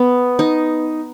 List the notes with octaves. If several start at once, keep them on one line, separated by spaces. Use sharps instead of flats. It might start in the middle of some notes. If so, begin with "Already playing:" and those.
Already playing: B3
D#4